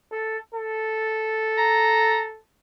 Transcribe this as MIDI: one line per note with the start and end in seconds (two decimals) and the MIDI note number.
0.12 0.37 69
0.54 2.40 69
1.58 2.24 82